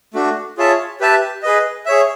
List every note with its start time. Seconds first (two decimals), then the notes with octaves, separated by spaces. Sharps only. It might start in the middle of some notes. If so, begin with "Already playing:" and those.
0.14 A3 D4 F#4
0.58 F4 G#4 C#5 E5 A5
1.00 G4 B4 E5 A5
1.43 G#4 B4 D#5
1.86 G#4 C#5 E5